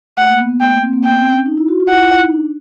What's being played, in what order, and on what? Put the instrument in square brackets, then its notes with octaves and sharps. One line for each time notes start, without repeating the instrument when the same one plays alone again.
[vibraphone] A3 [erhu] F#5
[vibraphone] A#3
B3
B3
[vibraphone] A3 [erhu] G5
[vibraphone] A#3
C4
A#3
[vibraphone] B3 [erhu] G5
[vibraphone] C4
C#4
D#4
E4
F#4
F4
[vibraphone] E4 [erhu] F#5
[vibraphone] F4
E4
D#4
D4